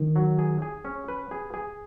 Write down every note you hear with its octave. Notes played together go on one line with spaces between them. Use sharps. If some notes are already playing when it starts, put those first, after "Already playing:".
Already playing: D#3
F#3
G#4
G#4
C#4
B4
G#4
G#4